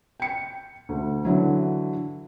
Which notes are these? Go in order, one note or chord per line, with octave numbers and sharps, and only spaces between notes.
G5 C#7
D2
D3 E3 F#3